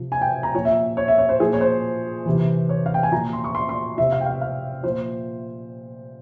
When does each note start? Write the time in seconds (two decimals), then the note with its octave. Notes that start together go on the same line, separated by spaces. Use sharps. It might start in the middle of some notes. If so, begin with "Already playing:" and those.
Already playing: C3 F3
0.12 G#5
0.21 G5
0.43 A#5
0.54 A#2 F3 C#5
0.65 E5
0.97 C#5
1.08 E5
1.18 C#5
1.29 C5
1.40 A#2 F3 G#4
1.53 C#5
1.61 C5
2.26 C3 E3
2.69 C#5
2.86 F5
2.94 G5
3.03 G#5
3.12 A#2 F3 A#5
3.33 C6
3.44 C#6
3.55 C6
3.69 C6
3.97 C3 F3 E5
4.12 F5
4.21 G5
4.26 F5
4.41 F5
4.83 A#2 F3 C5